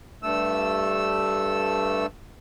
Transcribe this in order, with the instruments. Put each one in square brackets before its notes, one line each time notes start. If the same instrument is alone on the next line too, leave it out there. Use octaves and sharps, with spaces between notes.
[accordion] G2 A3 E6